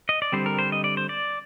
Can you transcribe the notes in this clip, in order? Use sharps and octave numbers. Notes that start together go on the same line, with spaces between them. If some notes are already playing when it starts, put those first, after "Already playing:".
D#5
D5
D3 G3 C4 C5
A#4
C5
D#5
D5
C5
D5